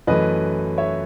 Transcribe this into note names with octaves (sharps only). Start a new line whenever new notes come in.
F#2 E3 A3 B4 D#5
C#5 E5